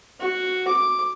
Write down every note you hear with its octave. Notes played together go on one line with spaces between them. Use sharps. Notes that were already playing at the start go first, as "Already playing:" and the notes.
F#4
D6